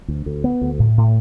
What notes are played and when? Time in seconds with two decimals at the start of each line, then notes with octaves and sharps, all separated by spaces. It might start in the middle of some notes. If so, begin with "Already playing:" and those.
0.08 D2
0.26 D2
0.44 B3
0.62 D2
0.79 A2
0.97 A2